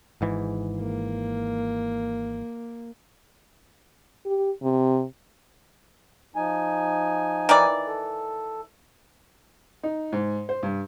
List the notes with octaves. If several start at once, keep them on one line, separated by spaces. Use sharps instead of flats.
G#1 G#2 E3
A#3
G4
C3
F3 D#4 G#5
D#3 E3 D5
A4
D#4
G#2
C5
G2